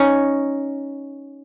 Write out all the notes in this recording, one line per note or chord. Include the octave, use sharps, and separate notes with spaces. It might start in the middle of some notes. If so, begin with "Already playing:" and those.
Already playing: C#4 D#4